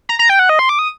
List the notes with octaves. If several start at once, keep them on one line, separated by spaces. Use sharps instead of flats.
A#5
A#5
G5
F#5
D#5
C6
D6
D#6